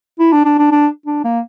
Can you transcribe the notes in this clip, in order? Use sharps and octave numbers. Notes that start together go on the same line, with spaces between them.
E4
D4
D4
D4
D4
D4
A#3